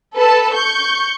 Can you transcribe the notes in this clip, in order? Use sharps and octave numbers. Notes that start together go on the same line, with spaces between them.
A4 B4 A5
C#6 G6